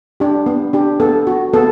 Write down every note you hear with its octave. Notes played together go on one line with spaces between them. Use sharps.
D4 G4
B3
D4 G4
B3 A4
F#4
B3 A4